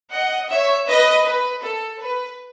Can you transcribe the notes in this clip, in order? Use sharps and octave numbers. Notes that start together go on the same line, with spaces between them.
D#5 F#5
C#5 E5
B4 D#5
B4
A4
B4